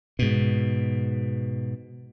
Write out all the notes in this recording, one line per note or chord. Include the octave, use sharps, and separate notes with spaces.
G#2 B2